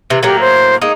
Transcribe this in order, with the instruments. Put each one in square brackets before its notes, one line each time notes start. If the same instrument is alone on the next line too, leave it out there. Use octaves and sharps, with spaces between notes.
[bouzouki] C3 E3
[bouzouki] A2 F#3 A#3 [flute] G4
[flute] C5
[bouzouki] G#3 A#3 D#4